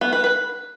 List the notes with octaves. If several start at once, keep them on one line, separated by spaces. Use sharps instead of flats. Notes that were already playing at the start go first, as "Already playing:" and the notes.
B3
B4
B4